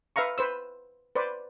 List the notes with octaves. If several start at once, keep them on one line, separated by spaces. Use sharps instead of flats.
B4 E5 F5 A#5 C#6
B4 C5 E6
B4 C5 D5